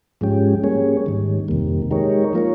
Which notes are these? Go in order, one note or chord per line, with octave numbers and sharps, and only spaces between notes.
G#2 F3 G#3 C#4 G4
G3 A#3 C#4 G#4 C#5
G#2 D#3 G3
F2 C3 D#3 G3 A#3
G#3 D#4 G4 A#4 C#5
F3 A#3 F4 A#4 C#5